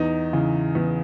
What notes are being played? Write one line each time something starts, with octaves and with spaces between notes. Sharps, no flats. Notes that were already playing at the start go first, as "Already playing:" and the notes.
Already playing: E2 D#4
C#3 E3
E2